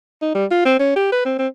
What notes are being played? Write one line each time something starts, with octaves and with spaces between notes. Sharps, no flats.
D#4
G3
F4
C4
C#4
G4
B4
C4
C4